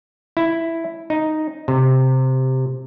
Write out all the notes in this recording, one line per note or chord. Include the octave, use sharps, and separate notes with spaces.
E4
D#4
C3